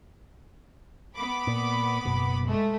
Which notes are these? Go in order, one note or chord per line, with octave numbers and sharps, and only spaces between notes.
B3 B5 D6
A#2
F#1 B2
G#3 A3